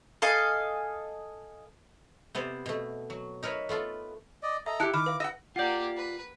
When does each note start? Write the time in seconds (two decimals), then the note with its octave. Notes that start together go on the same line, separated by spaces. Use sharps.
0.22 A4 D#5 F5 G#5
2.35 C3 B3 C5 D5
2.66 B2 A3
3.10 F#3
3.43 D#4 A#4 B4 C#5 E5
3.69 A3 B3 F4 A4
4.43 D5 D#5
4.66 A4 D#5 E5 A#5
4.80 E4 G4 A5 F#6 C#7
4.94 D#3 B5 D6 F6
5.06 B4 F5
5.20 D#5 F#5 E6 A#6
5.56 A#3 F4 G4 D5 F#5 G6
5.97 B4